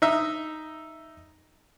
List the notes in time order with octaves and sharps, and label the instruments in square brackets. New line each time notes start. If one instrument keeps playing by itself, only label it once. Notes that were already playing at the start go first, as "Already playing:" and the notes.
[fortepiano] D#4 E5